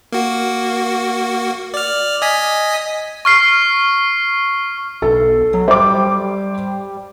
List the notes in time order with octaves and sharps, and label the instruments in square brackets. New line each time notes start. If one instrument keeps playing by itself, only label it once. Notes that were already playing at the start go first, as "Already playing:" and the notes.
[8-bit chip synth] A#3 F#4
D5 F6
D#5 G#5 B6
[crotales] C#6 F6 C7
[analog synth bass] B1 [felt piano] A4
[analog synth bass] F#3
[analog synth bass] G3 [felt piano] C5 D6